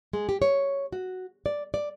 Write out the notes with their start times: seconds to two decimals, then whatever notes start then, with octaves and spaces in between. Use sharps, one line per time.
0.13 G#3
0.29 G4
0.42 C#5
0.93 F#4
1.46 D5
1.74 D5